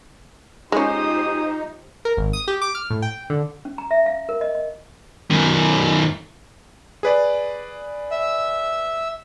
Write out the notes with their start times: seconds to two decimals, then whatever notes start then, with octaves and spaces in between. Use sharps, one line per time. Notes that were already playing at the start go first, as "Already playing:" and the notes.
0.72 G#3 C#4 D#4 F4 G4 G#4 C5 D#6
2.05 A#4
2.17 G#1
2.33 D#6
2.48 G4
2.62 D6
2.75 F6
2.90 A2
3.02 G5
3.30 D3
3.65 C#4
3.78 A#5
3.91 E5
4.06 F5
4.29 A#4
4.41 D#5
4.55 D#5
5.31 F#2 D#3
7.03 G#4 B4 D5
8.11 E5 E6